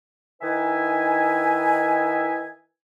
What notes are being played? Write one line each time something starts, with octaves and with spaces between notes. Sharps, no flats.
D#3 D#4 E4 B4 E5 G#5